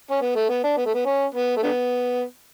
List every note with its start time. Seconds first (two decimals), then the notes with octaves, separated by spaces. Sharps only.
0.11 C#4
0.21 B3
0.35 A3
0.49 B3
0.64 D4
0.77 B3
0.86 A3
0.94 B3
1.05 C#4
1.34 B3
1.56 A3
1.63 D3 B3